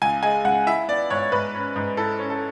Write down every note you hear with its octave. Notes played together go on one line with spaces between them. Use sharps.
C#2 G#5
G#3 G#5
C#2 F#5
E4 E5
B3 D5
G#2 C#5
G#2 B4
C#4
G#2
E4 A4
C#4
A4